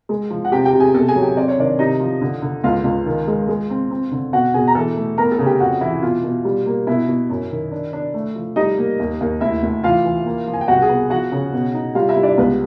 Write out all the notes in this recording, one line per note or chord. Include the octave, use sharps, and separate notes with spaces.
G#3
F3
F#5
C3 G4 G5
G4 G5
C3
G#4 G#5
B2 A4 A5
G#4 G#5
F#3
G4 G5
C4 D5
C#5
D#3 D4 D5
C3 D#4 D#5
F3
D3
D3
C#2 F4 F5
C#2
D#3
G#3
G#3
C4
C4
D3
B2 F#4 F#5
B2 G#4 G#5
A#5
E3 A4 A5
A3
B3 A#4 A#5
A4 A5
C#3
G4 G5
F2 F#4 F#5
E3 E4 E5
B2 F4 F5
B2
G3
A#3
B2 E4 E5
B2
F#2
D#3
D4
D4
A3
F3
G3 D#4 D#5
A#3
D#2
D#2
D2 E4 E5
D2
E3 F4 F5
E3
A#3
F3
G#5
G5
C2 F#4 F#5
G#4 G#5
B3
F3 F#4 F#5
C#3
B2
D#4
G3 F4 F5
E4 E5
G3
D4 D5
C#2 B3 B4